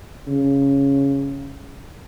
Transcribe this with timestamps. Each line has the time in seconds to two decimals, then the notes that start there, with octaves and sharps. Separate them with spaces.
0.27 C#3